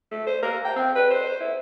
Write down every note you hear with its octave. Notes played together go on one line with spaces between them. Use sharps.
A3
C5
A#4
G5
C4
B4
C5
E4